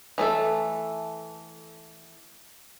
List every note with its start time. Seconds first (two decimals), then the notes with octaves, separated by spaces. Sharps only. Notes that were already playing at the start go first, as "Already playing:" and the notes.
0.18 E3 A3 A4 E5